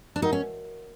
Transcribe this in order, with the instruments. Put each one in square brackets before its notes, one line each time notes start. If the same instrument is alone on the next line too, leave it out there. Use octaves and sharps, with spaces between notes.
[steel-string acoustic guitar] D4
[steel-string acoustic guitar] D#4 [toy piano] F#4 A#4 D#5 F#5
[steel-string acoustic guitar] C#4